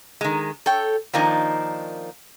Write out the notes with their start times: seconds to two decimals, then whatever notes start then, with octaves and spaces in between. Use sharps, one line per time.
0.21 D#3 G#3
0.66 A4 C#5 G5
1.13 D#3 F3 A#3 D4 D#4